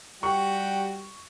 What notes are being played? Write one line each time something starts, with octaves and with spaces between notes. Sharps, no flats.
G3 F#4 G4 G5 C#6